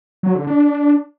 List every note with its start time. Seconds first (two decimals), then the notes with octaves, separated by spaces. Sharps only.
0.23 F#3
0.35 D3
0.47 D4